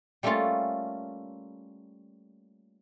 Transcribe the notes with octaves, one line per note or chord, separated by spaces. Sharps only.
G3 A3 A#3 C#4 F4 A4